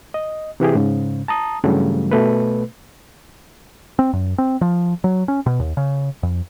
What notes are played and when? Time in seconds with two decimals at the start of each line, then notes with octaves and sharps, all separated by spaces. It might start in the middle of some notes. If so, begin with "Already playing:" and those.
0.14 D#5
0.60 C3 E3 G4 G#4
0.75 G#2 C#3
1.28 A5 A#5 D#6
1.64 G2 C#3 E3 F#3 G3 A3
2.11 B2 A3 B4
3.99 C4
4.13 F#2
4.38 C4
4.61 F3
5.04 F#3
5.28 C#4
5.46 B2
5.60 D#2
5.77 C#3
6.23 F2